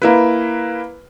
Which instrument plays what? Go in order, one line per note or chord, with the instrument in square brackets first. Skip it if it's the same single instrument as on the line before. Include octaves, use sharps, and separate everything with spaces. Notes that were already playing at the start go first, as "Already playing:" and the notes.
[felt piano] A#3 E4 B4